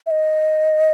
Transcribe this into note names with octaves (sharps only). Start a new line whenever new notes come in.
E5
D#5